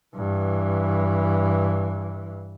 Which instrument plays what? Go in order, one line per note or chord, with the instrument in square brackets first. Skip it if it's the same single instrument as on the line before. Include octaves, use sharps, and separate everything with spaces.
[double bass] G2 E3